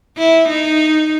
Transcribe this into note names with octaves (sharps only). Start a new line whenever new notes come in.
E4
D#4